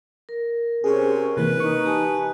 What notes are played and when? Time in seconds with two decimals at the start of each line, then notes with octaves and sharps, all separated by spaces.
0.29 A#4
0.84 C3 C#4 G#4 C5
1.37 C3 E3 A#3 B4
1.60 D#4 C#6
1.86 G4 G#5 A5